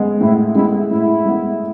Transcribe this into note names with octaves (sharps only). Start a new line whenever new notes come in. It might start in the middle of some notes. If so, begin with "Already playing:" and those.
Already playing: G#3 B3
A2 E4
G#3 B3 E4
A2 E4
G#3 B3